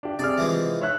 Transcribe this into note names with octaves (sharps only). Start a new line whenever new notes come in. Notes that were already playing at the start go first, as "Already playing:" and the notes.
D4 G4
C3 G#4 D5 F6
E3 F3 G#3
C#5 E5 F#6